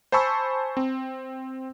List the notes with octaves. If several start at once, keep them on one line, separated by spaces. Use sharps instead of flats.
C5 G#5 A5 B5 C#6 E6
C4